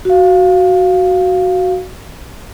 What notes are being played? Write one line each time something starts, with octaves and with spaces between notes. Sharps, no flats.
F#4 F5